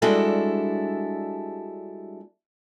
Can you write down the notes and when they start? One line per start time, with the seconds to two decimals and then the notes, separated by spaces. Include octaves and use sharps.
0.02 G3 G#3 D4 E4 F#4 A4